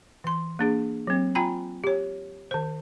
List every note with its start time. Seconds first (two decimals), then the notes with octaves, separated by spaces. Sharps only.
0.24 E3 C6
0.59 A#3 D4 G#4
1.07 F#3 C4
1.35 F4 G5 G#5 A#5 B5
1.84 G4 C#5
2.51 D#3 C5